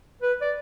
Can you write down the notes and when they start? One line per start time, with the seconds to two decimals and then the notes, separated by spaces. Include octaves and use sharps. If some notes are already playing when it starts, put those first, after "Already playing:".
0.22 B4
0.41 D5